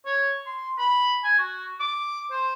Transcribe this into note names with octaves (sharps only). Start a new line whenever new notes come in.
C#5
C6
B5
G#5
F#4
D6
C5